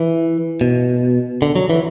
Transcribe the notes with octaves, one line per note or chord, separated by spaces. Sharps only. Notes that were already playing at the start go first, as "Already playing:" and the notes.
Already playing: E3
B2
D3
F#3
E3